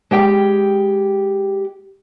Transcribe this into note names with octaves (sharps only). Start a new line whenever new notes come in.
G#3 G4 G5